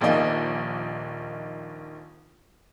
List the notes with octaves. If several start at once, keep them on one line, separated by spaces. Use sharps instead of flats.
D#1 A#1 A#3 D#4 D#5